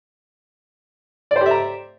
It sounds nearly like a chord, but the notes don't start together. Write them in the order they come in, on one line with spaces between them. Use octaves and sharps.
D5 C5 G4 E5 A#5